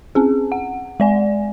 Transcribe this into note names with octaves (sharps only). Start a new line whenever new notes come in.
C4 C#4 G#4
F#5
G#3 D5 G#5